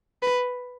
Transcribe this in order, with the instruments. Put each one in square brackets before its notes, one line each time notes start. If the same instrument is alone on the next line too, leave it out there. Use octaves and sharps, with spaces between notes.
[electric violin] B4